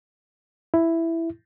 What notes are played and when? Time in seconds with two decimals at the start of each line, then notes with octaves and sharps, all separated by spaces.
0.74 E4